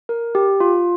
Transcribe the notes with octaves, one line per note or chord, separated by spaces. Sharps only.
A#4
G4
F4